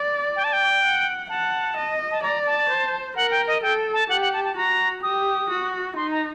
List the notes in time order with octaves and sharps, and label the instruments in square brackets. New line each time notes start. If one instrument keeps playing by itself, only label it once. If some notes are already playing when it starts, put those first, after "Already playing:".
Already playing: [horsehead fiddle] D5
[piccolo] G5
A5
G5
[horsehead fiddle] F#5
[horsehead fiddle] F#5 [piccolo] A5
[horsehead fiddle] D#5
[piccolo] A5
[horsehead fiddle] D5 [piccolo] A#5
[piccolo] A5
[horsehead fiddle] C5
[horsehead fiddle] A#4 [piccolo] F#5
[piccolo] G5
D#5
[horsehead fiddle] A4 [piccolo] G5
[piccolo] A5
[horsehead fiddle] G4 [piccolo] F#5
[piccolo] F#5
A5
A5
[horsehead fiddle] F#4 [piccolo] A#5
[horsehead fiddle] G4 [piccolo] D#6
[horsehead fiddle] F#4
[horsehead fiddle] D#4 [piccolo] C6
[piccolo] A#5